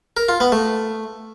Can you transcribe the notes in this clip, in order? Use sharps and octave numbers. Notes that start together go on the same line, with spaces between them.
A#4
F4
B3
A3